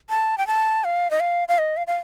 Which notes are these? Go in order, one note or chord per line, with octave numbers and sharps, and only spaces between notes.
A5
G5
A5
F5
D#5
F5
F5
D#5
F5
F5